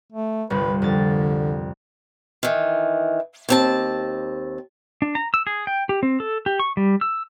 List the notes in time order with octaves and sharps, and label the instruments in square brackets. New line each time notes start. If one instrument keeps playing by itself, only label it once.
[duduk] A3
[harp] G1 C2 [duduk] B4
[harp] F2 A6 [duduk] D3
[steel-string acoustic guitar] D#3 E3
D#2 C4 A5
[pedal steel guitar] D4
A#5
E6
G#4
G5
G4
C4
A4
G4
C#6
G3
E6